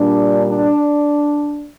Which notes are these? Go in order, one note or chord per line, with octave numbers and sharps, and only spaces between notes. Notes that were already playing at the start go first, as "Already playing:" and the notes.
Already playing: A#2 G3 D4
D4